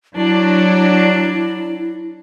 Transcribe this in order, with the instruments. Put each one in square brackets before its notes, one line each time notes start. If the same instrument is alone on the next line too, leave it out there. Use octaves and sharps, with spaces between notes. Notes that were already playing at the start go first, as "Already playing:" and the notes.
[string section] F#3 D4 [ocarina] E4